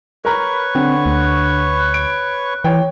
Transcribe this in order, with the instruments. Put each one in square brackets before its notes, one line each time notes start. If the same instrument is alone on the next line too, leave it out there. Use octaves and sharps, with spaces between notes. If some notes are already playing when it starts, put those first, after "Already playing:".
[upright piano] A#4 A#5 B5 [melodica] B4 C#5 C#6
[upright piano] D3 [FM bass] C4
[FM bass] D2
[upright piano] D7
[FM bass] E3 [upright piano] C#5 G5